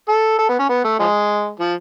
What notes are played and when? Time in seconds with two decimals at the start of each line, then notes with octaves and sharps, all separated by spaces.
0.09 A4
0.39 A4
0.49 B3
0.59 C#4
0.69 B3
0.85 A3
0.99 F3 G#3
1.59 F3